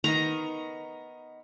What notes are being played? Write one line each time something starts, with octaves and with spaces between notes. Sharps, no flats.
D#3 B3 D#4 A#5